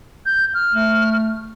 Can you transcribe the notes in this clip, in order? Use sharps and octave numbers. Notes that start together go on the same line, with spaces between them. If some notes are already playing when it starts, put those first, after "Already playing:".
G6
F6
A3